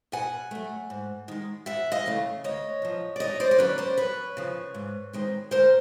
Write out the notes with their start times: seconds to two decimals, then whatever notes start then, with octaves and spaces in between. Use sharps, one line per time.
0.12 B2 F#5 G#5
0.51 F#3 A3
0.90 G#2
1.28 D#3 G#3
1.66 F2 E5 F#5
1.92 D#5 F5
2.06 C#3 E3 A3 C#4
2.44 D2 C#5 D#5
2.82 C3 F3
3.16 D5
3.20 D#2 C#5 D#5
3.40 C5 D5
3.51 D5
3.58 D3 F#3 A#3 C#4 B4 C#5
3.78 C5 D5
3.97 F#2 B4 C#5
4.37 C#3 F3
4.74 G#2
5.13 D#3 G#3 C4
5.51 D2 A#4 C5